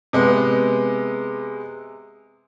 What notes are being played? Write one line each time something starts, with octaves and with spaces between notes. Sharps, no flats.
C3 G#3 B3